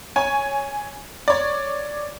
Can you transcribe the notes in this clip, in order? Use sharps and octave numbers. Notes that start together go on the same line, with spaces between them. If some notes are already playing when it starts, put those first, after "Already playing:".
C#5 G#5
C#5 D5